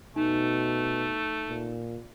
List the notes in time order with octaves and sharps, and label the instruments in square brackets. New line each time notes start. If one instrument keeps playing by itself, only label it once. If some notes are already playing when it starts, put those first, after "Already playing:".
[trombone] B2 [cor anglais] A3 [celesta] D#4
[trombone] A#2